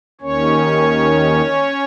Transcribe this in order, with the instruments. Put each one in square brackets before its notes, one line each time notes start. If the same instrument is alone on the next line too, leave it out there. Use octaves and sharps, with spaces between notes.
[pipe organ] D#2 D#3 C#4 C#5